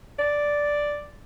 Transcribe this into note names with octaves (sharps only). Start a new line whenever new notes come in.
D5